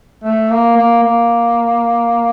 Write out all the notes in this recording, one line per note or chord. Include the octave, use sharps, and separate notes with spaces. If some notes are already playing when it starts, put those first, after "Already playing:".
A3
A#3
A#3
A#3